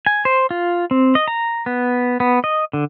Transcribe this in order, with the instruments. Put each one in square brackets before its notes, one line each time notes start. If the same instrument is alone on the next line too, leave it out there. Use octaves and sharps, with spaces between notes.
[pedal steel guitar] G#5
C5
F4
C4
D#5
A#5
B3
B3
D#5
D3